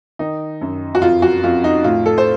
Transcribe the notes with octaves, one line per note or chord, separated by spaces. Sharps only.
D#3 D#4
F#2
F#4
F2 F4
F#4
F2 F4
D#4
A2 F4
A4
C5